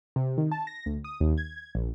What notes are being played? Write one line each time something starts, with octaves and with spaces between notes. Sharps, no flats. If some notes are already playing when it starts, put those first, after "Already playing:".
C3
D#3
A5
A#6
D2
D#6
D#2
G#6
A#1